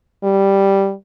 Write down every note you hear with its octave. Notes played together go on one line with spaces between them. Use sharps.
G3